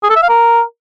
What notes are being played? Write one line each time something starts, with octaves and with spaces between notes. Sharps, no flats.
G#4
A4
E5
F5
A#4